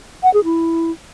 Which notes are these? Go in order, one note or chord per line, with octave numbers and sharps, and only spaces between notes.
F#5
G#4
E4